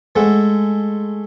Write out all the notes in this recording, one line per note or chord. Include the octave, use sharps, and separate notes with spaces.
G#3 A3 A4 F#5